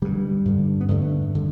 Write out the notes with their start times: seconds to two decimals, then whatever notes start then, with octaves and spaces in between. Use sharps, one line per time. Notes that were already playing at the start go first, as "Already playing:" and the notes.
0.02 G2 D3 G3
0.45 G2 D3
0.81 B3
0.88 G2 D3 A3
1.35 D3